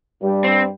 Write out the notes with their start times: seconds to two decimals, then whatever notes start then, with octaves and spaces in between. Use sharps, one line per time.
0.22 G2 G3
0.44 C4